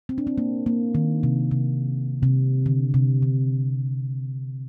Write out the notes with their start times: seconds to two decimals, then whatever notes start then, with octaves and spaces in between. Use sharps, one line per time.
0.09 C4
0.18 D4
0.27 C4
0.38 A#3
0.66 A#3
0.95 D#3
1.23 C3
1.51 C3
2.23 C3
2.66 D3
2.94 C3
3.22 D3